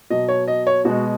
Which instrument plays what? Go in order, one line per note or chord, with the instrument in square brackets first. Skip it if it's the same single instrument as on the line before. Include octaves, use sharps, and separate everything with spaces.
[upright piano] B2 F#3 D#5
C#5
D#5
C#5
B2 G#3 F#4